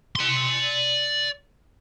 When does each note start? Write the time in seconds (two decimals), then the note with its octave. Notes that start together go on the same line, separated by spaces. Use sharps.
0.15 D5 C6